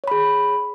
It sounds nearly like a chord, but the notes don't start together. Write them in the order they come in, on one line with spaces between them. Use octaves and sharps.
C#5 B5 G#4